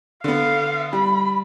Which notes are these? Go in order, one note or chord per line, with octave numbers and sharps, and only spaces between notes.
D3 B3 F5
G3 B5